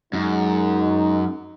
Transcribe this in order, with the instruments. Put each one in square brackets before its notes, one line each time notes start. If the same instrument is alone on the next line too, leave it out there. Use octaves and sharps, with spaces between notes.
[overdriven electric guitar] F#2 [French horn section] G#3 D#4